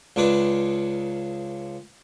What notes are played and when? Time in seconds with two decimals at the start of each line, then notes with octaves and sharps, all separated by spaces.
0.16 C#2 C#3 D4 B4